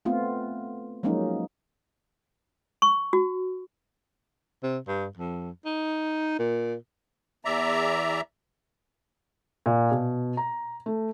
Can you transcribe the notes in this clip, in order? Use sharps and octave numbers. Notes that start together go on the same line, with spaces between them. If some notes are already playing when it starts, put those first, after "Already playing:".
A3 B3 C4 F4
F3 F#3 G#3 A#3 C#4 D#4
C#6
F#4
C3
G2
F2
D#4
A#2
E2 D5 E5 A#5
A#2
B2
A#5
A3